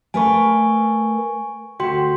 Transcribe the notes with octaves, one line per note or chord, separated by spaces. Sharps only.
A3 A#4 B4 G#5 C#6
D2 F#4 G5 C6